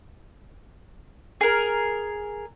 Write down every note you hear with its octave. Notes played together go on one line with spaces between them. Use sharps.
G#4 A#4